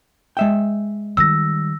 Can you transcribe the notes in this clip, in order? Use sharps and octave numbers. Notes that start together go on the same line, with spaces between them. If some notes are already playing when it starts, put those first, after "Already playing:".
G#3 E5 G5
D#3 G3 E6 A#6